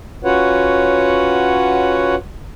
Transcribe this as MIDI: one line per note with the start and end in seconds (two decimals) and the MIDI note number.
0.24 2.15 61
0.24 2.15 65
0.24 2.15 66
0.24 2.15 71
0.24 2.15 73
0.24 2.15 78